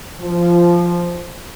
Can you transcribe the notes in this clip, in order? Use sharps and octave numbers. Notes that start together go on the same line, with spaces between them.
F3